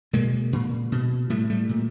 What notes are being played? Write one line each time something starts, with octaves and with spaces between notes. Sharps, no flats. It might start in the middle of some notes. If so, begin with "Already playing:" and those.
B2 G#3 A#3
A#2
B2
A2 G3 A3
G3 A3
A#2